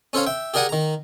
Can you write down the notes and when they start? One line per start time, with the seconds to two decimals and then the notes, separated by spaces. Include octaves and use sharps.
0.13 C#4 A4 C5 C#5 F5
0.27 E5 G5
0.54 G4 G#4 A#4 D5 F#5 G#5
0.69 D#3 A#5